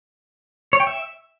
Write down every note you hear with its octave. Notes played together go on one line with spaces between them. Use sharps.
C#5
G5
E5